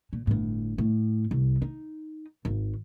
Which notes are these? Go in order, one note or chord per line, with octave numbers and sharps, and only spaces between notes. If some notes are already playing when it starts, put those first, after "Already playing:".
A#2
G1 A2
A2
C2
D#4
G#1